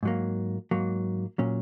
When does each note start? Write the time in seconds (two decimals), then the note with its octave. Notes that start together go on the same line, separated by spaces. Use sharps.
0.03 G#2 F#3 A#3
0.71 G#2 F#3 A#3
1.38 A#2 F#3 C#4